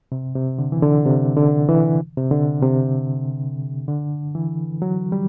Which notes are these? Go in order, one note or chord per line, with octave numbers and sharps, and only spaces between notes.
C3
C3
D3
E3
D3
C3
D3
E3
C3
D3
C3
D3
E3
F#3
G3